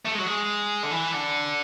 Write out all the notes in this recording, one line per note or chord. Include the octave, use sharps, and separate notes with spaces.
A3
G#3
F#3
G#3
D3
E3
D3